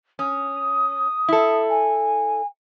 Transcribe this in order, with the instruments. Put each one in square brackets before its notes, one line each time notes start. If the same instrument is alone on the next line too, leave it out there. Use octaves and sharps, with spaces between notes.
[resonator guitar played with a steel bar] C#4 [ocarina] D#6
[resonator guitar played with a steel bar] E4 A4
[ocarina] G#5